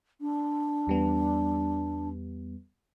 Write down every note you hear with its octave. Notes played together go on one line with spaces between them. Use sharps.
D4
E2 G3 B3